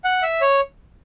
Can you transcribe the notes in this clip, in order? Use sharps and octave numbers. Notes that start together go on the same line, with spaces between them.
F#5
E5
C#5